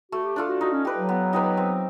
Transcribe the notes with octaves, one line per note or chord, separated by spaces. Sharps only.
A3 F#4
G4
D4 F4 A4
F#4
D#4 F#4
C#4
G4 B4
F#3
B3
D#4 G4 B4
C4